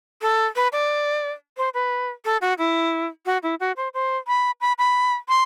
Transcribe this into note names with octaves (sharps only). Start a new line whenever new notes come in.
A4
B4
D5
C5
B4
A4
F#4
E4
F#4
E4
F#4
C5
C5
B5
B5
B5
C6